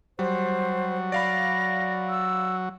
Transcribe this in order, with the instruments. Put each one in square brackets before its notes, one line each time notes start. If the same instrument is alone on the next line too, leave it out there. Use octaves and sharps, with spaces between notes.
[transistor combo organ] F#3 [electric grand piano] G3 [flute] C5
[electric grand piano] D5 F5 B5 [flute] A#6
[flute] E6